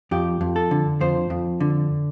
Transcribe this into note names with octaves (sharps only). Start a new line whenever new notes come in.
F2 G4
F2
A4
D3
F2 C5
F2
D3